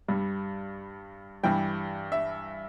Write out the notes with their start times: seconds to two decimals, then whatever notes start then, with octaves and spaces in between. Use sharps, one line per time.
0.08 G2 G3
1.43 G2 E3 G3 G5
2.12 E5